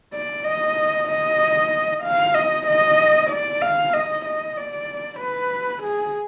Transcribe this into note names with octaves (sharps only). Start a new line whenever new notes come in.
D5
D#5
D#5
F5
D#5
D#5
D5
F5
D#5
D#5
D5
B4
G#4